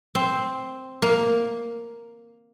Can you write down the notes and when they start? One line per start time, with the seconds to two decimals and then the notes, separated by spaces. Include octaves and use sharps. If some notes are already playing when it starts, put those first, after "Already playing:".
0.15 C4
1.02 A#3